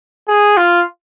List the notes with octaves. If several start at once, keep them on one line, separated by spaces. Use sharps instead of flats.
G#4
F4